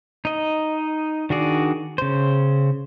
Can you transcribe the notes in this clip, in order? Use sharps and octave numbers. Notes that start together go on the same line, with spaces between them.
D#4 D#5
D#3 D4 F#4 G#4 D5
C#3 C5